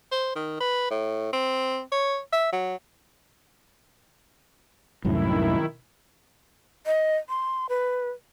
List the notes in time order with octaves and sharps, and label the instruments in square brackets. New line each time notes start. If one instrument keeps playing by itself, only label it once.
[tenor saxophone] C5
D#3
B4
A2
C4
C#5
E5
F#3
[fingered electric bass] C2 F#2 A2 [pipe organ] D#3 E4
[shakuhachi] D#5
C6
B4